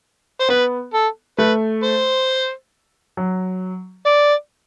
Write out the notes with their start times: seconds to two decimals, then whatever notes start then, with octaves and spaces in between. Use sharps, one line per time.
0.40 C5
0.49 B3 B4
0.93 A4
1.38 A3 B4
1.83 C5
3.17 F#3
4.06 D5